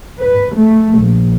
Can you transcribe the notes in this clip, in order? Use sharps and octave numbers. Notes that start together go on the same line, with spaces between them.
B4
A3
A#1